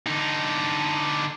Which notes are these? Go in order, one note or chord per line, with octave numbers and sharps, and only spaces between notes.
D3 D#4